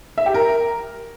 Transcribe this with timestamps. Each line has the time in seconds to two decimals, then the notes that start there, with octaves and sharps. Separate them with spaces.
0.18 E5
0.26 G4
0.34 A#4